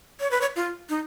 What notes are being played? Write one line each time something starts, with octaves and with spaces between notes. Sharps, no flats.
C#5
B4
C#5
F4
D#4